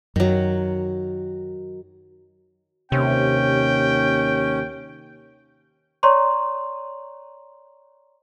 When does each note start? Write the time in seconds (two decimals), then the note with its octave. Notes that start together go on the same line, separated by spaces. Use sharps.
0.16 F#2 D#3 F#3
2.92 D#2 C3 C#4 G5
6.03 C#5 D5 A#5 C6 C#6